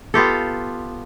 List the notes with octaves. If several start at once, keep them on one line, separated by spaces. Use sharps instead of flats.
B3 F4 G4 A4